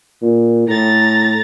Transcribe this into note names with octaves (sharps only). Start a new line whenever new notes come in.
A#2
A2 A#5 A6